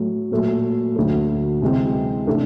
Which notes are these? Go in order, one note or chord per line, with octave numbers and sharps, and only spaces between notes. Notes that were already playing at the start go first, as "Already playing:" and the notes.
Already playing: A2 F#3 A3
A#2 F#3 A3
D2 D3 F#3 A3
C3 E3 G#3 C4
C3 E3 A3 D4